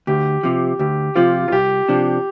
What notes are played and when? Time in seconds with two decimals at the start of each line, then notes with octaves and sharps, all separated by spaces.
0.07 D2 G4
0.43 C3 F3
0.79 D2 G4
1.15 C3 F3 F4
1.48 F4
1.51 C2 G4
1.89 C3 F3 D4